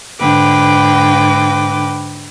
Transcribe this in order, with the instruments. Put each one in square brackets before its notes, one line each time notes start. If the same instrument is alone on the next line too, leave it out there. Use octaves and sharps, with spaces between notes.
[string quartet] G#2 D3 B4 G5 D6